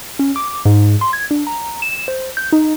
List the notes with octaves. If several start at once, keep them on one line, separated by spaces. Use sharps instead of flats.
C#4
D6
G#2
C6
G#6
D4
A#5
E7
C5
G6
D#4